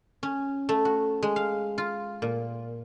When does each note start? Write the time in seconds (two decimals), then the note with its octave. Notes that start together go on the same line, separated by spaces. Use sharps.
0.23 C#4
0.69 A3
0.85 F#4
1.23 G#3
1.36 F5
1.78 F4
2.22 A#2